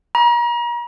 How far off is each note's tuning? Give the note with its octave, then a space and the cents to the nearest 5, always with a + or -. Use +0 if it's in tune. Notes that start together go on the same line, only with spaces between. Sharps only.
A#5 +40